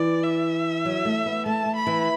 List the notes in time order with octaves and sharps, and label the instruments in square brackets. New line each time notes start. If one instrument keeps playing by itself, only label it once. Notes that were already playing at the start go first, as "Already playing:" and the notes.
Already playing: [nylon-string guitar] E3 [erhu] D5
[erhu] E5
[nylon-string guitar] F#3
A3
B3
[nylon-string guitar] A3 [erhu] A5
[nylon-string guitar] A3
[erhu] B5
[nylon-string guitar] E3